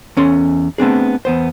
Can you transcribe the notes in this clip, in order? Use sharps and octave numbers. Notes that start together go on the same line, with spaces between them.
E2 C#4 A4 C6
A3 B3 C4 D4 G#4
E2 B3 C5